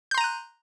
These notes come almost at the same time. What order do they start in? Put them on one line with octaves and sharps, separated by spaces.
G6 C6 A#5 D#7 F#6